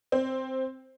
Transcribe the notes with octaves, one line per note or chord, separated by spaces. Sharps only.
C4